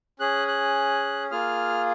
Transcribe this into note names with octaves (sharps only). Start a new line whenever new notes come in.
C#4 G#4 F#6
F#6
A#3 F4 G#4 F6